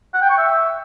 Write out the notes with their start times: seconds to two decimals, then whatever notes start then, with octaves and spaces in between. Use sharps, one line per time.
0.14 F#5
0.22 G5
0.30 C#6
0.38 E5